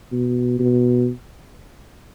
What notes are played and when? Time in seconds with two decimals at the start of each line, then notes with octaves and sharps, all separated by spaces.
0.12 B2
0.59 B2